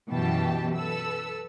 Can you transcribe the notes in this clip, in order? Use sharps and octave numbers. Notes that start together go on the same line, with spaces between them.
F#2 B2 E3 G4 G5 A5
A4 B4 E6